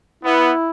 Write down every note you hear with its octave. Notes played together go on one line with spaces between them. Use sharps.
B3 E4